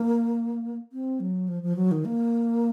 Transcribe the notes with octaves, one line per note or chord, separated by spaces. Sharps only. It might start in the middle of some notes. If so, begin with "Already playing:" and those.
Already playing: A#3
C4
F#3
F3
F3
F#3
D#3
A#3